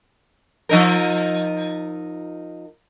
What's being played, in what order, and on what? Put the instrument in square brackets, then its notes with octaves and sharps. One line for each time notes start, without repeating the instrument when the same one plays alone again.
[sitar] F3 D#4 A#4